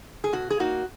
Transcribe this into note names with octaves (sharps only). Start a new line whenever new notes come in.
G#4
B2 F#4
G#4
A#3 D#4 F#4